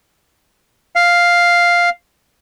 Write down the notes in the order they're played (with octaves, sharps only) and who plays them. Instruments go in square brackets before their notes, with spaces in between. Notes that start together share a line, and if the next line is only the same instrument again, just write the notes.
[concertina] F5